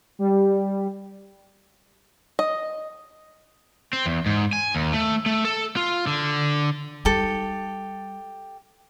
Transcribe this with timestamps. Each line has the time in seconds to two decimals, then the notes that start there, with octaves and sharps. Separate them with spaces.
0.19 G3
2.39 D#5
3.93 C4
4.06 E2
4.26 G#2
4.53 G#5
4.75 D#2
4.93 A3
5.26 A3
5.45 A4
5.77 F4
6.07 D3
7.05 G3 D#4 G4 A4